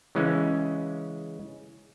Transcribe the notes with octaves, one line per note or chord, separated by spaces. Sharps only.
C#3 E3 G#3 C#4